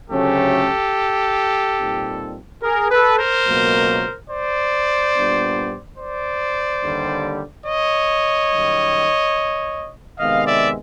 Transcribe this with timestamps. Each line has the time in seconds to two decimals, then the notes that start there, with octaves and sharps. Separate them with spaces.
0.10 D2 C#3 F#3 A3 C#4 G4 A4
1.78 A#2 G3 C4 D#4
2.62 G#4 A#4
2.91 A4 B4
3.19 A#4 C5
3.47 C#2 B2 F#3 A#3
4.31 C5 D5
5.15 A#2 G3 B3 D4
5.99 C5 D5
6.83 D#2 D3 G3
7.67 C#5 D#5
8.51 F#2 D#3 G3
10.19 C3 D#3 G#3 B3 D#5 F5
10.47 D5 E5